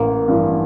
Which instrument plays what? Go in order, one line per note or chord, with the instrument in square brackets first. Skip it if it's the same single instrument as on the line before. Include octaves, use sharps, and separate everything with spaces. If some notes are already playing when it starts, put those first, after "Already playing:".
Already playing: [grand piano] A1 [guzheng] A#3
[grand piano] G2 E3